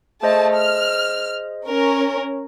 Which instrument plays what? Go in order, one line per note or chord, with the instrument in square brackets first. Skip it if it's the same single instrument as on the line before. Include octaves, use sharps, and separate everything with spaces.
[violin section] A3 A5 [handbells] G#4 C5 D#5
[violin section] F6
C#4 A#4